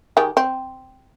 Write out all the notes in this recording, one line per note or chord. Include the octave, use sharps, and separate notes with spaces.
D#3 G4 G#4
C4